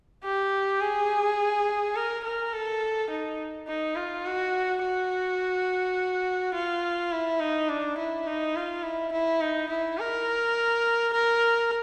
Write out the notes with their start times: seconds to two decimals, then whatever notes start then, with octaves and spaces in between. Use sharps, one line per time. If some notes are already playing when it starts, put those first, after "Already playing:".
0.24 G4
0.81 G#4
1.96 A#4
2.24 A#4
2.53 A4
3.10 D#4
3.68 D#4
3.96 F4
4.26 F#4
4.83 F#4
6.55 F4
7.12 E4
7.40 D#4
7.69 D4
7.98 E4
8.27 D#4
8.56 F4
8.83 E4
9.13 E4
9.41 D#4
9.70 E4
9.99 A#4
11.13 A#4